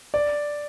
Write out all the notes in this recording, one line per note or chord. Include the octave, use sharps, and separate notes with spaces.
D5